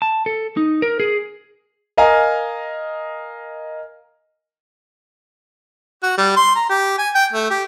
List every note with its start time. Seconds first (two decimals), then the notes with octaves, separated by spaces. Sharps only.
0.02 A5
0.26 A4
0.57 D#4
0.82 A#4
1.00 G#4
1.97 A#4 D#5 F5 G#5 A#5
6.03 F#4
6.17 G3
6.37 C6
6.56 A#5
6.70 G4
6.98 G#5
7.15 G5
7.33 A3
7.51 G4